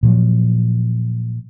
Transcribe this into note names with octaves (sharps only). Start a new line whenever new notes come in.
A#2 F3 F#3